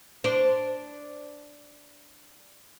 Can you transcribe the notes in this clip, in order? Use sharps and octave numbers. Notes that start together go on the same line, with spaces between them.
D4 C5